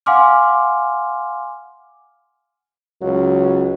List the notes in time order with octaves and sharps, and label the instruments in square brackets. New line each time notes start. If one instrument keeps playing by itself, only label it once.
[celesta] F5 F#5 G#5 C6 D6 F6
[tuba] C#2 [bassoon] F#3